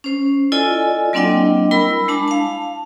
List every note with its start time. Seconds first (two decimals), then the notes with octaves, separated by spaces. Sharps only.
0.04 C#4 C5
0.52 E4 F4 A4 D5 D#5 G#5
1.13 F#3 A#3 C4 D4 D#5 G5
1.71 G3 E4 A#4 B5 E6
2.08 G#3 D4 A5
2.28 F5 A5